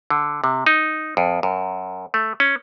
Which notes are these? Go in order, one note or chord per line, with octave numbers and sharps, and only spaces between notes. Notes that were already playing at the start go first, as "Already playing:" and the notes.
D3
C3
D#4
F2
F#2
A3
C#4